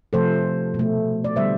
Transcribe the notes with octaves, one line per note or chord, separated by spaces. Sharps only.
C3 F3 A3 A4 C5
B2
A3
D5
D3 G3 B3 C5 E5